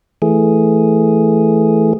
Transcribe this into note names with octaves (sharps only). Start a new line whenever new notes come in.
E3 A3 G#4